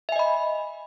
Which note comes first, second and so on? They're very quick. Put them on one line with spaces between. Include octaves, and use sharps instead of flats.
E5 G#5 D#5 B5